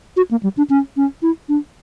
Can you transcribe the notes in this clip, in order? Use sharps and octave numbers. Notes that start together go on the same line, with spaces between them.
F#4
A#3
G3
D4
C#4
C#4
E4
D4